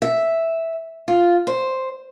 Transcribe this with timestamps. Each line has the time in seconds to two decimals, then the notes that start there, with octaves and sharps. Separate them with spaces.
0.02 E5
1.08 F4
1.47 C5